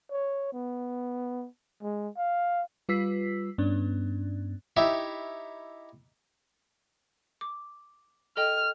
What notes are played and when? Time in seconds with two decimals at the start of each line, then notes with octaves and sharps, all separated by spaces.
0.11 C#5
0.53 B3
1.83 G#3
2.17 F5
2.89 G3 F4 B4 E6 B6 C7
3.58 G2 B3 C#4 D4
4.77 D#4 E4 G4 C#5 E5
7.41 D6
8.37 A4 D#5 G5 F6